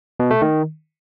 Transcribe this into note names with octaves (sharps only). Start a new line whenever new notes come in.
B2
A3
D#3